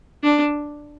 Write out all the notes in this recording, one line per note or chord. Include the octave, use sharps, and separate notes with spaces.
D4